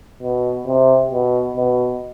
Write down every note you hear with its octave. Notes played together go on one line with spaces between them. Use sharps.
B2
C3
B2
B2